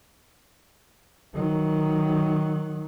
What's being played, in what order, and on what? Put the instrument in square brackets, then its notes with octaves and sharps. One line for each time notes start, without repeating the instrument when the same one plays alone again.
[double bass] D#3 F#3